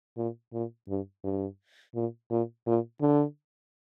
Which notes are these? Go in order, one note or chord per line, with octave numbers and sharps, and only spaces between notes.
A#2
A#2
G2
G2
A#2
A#2
A#2
D3